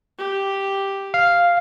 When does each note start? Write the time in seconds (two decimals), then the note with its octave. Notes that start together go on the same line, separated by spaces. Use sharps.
0.18 G4
1.14 F5